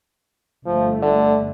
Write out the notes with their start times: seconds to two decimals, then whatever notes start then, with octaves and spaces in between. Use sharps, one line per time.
0.66 G1 F3 A3
1.02 D3